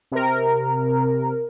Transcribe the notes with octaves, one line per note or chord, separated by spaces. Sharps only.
C3 A#4